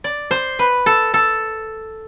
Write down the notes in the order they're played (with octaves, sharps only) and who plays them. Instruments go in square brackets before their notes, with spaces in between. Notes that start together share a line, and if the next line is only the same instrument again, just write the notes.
[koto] D5
C5
B4
A4
A4